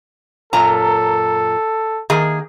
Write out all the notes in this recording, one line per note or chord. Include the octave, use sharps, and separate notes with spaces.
F#2 A#2 A4 A#5
D#3 A#3 G#4